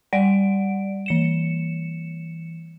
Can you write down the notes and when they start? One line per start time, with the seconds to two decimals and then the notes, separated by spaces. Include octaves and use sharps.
0.13 G3 D5 F#5 D7
1.06 E3 C#7 E7